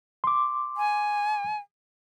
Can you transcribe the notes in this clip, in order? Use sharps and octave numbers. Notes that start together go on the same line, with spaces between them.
C6 D6
G#5